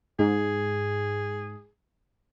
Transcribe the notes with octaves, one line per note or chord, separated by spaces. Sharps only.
G#2 G#4